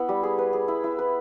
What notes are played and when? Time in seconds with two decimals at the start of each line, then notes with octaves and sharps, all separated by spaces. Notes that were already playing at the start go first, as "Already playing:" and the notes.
Already playing: B3 E4
0.09 G3
0.23 G#4
0.38 B4
0.53 G#4
0.68 E4
0.84 E4
0.99 B4